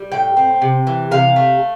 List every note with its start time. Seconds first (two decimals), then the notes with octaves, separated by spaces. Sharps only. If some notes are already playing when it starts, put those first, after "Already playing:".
Already playing: G3
0.12 A2 G5
0.37 C4
0.62 C3
0.87 E3
1.11 C3 F5
1.36 A3